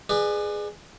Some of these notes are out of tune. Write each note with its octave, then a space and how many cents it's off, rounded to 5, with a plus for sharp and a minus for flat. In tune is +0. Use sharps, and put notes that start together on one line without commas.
G#4 +0 B4 +0 D5 +35